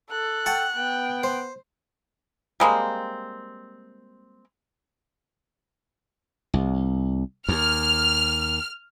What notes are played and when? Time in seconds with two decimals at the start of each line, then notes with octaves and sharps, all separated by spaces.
0.11 A4 F#6
0.46 F#5 G5 A5 C#6
0.76 B3 G5
1.23 C5
2.60 G3 G#3 A#3 C4
6.54 C2
7.48 D#2 F6